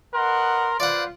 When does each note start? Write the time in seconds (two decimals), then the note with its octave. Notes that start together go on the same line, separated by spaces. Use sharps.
0.14 A#4 B4 D#5 F#5 C6
0.80 F4 B4 C5 D5 F5 F#5